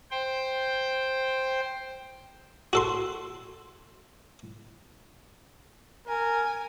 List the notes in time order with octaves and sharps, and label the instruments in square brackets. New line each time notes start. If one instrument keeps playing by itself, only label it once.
[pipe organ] C5 G5
[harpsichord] F#4 A4 C6
[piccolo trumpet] A#4 [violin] G#5